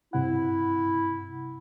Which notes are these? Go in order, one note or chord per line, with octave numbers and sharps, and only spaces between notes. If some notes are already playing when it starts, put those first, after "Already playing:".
G2 C3 E4 F#5